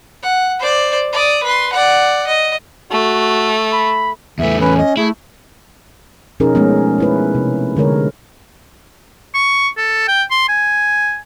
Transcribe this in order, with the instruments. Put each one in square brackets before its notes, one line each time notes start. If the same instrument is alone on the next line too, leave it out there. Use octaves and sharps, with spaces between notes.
[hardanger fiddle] F#5
C5 D5
D5 D#6
B4 C6
D5 F#5
D#5
[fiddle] A3 [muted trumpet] F#4
[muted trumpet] B5
[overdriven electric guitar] E2 A3 [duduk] E3 [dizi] E5
[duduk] C#4 [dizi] B4
[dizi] D#5
[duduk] A3 [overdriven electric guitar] E4 [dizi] G#4
[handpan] B2 F3 C#4 D#4 G#4 A#4
F3 G#3 A3 B3 C#4
A3 E4 B4
C3
D3 G#3 A#4 C#5
[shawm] C#6
A4
G5
C6
G#5